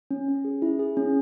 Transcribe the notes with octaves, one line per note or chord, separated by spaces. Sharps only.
C#4
C#4
G#4
E4
G#4
C#4